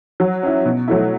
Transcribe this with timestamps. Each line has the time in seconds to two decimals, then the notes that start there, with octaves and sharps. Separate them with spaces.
0.20 F#3
0.43 C#4 E4
0.65 B2
0.88 F#3 A3 E4